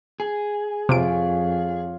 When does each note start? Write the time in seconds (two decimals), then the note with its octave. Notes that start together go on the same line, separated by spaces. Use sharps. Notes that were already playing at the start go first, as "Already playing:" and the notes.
0.20 G#4
0.89 F2 C3 F4 C#5 D7